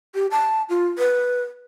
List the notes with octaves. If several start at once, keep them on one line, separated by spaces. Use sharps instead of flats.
G4
A5
F4
B4